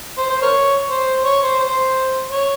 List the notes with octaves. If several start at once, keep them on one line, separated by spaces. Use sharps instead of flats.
C5
C5
A#4 C#5
C5
C#5
C5
C5
C#5